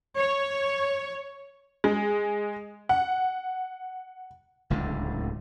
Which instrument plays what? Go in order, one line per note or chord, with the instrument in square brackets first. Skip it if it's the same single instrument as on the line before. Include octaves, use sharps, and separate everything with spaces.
[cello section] C#5
[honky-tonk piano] G#3
F#5
[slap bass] D1 C#2 A2 D3